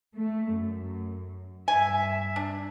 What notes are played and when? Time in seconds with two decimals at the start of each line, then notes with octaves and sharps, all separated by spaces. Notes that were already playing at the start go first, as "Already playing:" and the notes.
0.17 A3
0.57 F#2
1.68 G2 E5 G#5
2.36 D4